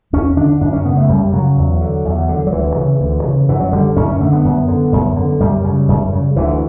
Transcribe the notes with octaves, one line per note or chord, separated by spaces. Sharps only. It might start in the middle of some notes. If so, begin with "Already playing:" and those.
E2 C#4
D3 D4
F#2 D4
C#4
C#3 B3
A3
F#2 G3
C#3 F#3
E2
D3
E2
D3
F#3
D2 E3
C#3
D2
C#3
F#2 E3
F#3
D3 G3
F#2 C#4
C#4
D3 A3
B3
F#2
D3
F#2
D3
F#2 G3
C#3
F#2
C#3
D2 E3